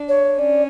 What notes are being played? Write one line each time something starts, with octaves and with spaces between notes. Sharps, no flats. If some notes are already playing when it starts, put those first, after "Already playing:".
Already playing: D4
C#5
C#4 D5